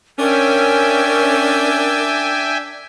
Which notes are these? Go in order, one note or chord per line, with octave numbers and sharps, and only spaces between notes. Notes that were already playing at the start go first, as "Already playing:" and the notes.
C#4 D4 A#4 E5 G5 G#5